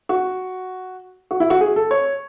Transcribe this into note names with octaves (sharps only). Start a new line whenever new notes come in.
F#4
F#4
E4
F#4
G#4
A4
C#5